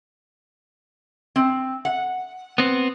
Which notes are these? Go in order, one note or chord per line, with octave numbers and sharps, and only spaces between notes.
C4
F#5
B3 C4